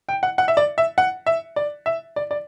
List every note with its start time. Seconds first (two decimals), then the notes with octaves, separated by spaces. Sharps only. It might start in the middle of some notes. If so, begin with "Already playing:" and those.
0.09 G5
0.23 F#5
0.38 F#5
0.48 E5
0.57 D5
0.78 E5
0.98 F#5
1.26 E5
1.56 D5
1.86 E5
2.16 D5
2.31 D5